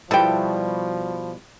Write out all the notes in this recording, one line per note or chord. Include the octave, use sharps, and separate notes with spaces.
B2 F3 G3 E4 A4 G5